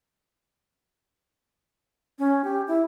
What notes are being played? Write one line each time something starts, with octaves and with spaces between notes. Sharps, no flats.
C#4
G4
E4